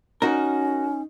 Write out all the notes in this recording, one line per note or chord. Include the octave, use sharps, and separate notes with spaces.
C#4 D#4 F#4 A#4